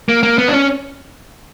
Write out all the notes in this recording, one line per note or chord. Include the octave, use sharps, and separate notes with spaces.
A#3
A#3
B3
D4
C#4